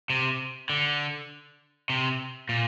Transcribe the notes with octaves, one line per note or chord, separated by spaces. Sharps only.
C3
D3
C3
A#2